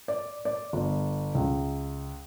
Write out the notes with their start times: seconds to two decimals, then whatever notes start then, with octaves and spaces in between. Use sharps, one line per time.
0.08 D5
0.45 D5
0.73 G1
1.35 C#2